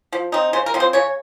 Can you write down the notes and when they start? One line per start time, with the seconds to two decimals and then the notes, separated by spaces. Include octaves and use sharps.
0.13 F3
0.32 C4 D#4
0.53 C#3 C5
0.66 A#4
0.74 F3 C4
0.80 C5
0.93 C#3 C#5